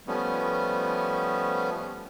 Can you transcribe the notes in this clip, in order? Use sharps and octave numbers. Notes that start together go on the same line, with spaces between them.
F3 G3 A3 B3 C#4